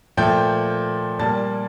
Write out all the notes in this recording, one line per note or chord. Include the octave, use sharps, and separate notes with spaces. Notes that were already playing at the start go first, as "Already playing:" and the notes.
A#2 F3 A3 G5 G6
A#2 G3 A#3 A5 A6